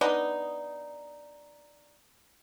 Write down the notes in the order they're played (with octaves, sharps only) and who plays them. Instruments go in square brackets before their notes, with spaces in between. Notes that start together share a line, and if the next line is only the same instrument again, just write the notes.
[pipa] B3 D4 D#4 D#5